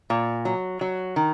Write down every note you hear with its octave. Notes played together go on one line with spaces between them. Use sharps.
A#2
F#3
F#3
D#3